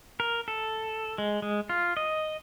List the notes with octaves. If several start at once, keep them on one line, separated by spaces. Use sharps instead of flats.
A#4
A4
G#3
G#3
F4
D#5